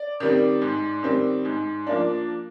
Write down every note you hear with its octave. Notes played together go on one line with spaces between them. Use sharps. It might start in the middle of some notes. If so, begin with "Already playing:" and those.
Already playing: D5
D#3 G3 C4
G#2
D#3 G3 C4
G#2
F3 A#3 D4